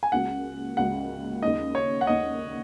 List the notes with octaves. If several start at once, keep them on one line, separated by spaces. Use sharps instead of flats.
G#5
C#2 C#3 A#3 F#4 F#5
C#2 C#3 A#3 F#4 F#5
D#2 C#3 A#3 D#4 D#5
C#5
F#5
D#2 C#3 A#3 D#4 D#5